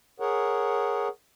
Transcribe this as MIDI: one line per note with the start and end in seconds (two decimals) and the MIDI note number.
0.20 1.08 68
0.20 1.08 70
0.20 1.08 73
0.20 1.08 78